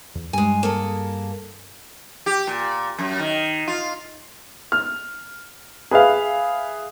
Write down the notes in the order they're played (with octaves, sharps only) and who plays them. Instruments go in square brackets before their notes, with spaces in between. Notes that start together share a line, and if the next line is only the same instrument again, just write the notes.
[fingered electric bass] E2
[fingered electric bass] G2 G3 [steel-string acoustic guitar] G#3 G#5
[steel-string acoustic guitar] A#3 G#4 A4
[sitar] G4
A#2
F#2
D#3
F4
[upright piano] F6
G#4 B4 E5 F5